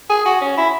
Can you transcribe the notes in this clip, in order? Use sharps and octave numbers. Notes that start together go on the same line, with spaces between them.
G#4
F#4
C#4
E4